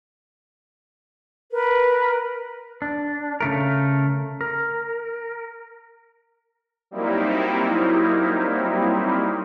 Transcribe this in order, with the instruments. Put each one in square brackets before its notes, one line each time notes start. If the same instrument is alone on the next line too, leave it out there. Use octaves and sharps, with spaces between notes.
[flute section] A#4 B4
[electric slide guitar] D4
C#3 A3 A#4
A#4
[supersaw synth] F#3 G3 A#3 C4 D#4 E4